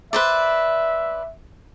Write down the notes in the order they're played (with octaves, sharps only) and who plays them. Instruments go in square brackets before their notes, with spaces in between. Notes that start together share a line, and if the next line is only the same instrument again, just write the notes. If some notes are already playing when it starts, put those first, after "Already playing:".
[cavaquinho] B4 C5 D5 [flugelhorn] E5